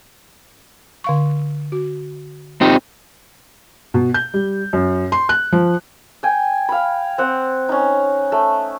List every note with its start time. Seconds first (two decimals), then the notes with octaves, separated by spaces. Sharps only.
1.04 D3 F5 C#6
1.72 F#4
2.61 C4 D#4 F4 G4
3.94 B2
4.14 G6
4.34 G3
4.73 F#2
5.12 C6
5.29 F#6
5.52 F3
6.23 G5 G#5
6.69 F5 B5
7.18 C4 F#5
7.69 C#4 D#4
8.32 A3